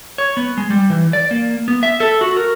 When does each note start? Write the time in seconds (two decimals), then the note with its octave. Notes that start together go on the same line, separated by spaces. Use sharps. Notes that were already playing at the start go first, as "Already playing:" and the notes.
0.18 C#5
0.37 B3
0.58 G#3
0.70 G3
0.90 E3
1.13 D5
1.31 A#3
1.68 B3
1.83 E5
2.00 A4
2.21 F#4
2.37 A#4